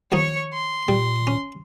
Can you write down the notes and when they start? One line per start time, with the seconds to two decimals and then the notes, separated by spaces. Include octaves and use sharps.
0.12 D#2 F3 D#4 C#5 C#6
0.53 C6
0.88 A#2 G3
1.27 C#4